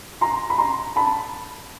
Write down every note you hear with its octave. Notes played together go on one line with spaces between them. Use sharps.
A#5 C6
B5
A#5 C6
A5 B5